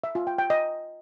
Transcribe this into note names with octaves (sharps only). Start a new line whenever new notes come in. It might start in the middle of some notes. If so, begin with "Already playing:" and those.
E5
F4
G5
G5
D#5